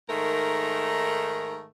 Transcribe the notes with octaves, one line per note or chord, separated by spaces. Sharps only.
G#2 D#3 A3 A#4